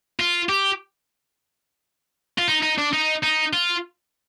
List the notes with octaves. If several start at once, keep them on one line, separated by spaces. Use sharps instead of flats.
F4
G4
F4
D#4
D#4
D4
D#4
D#4
F4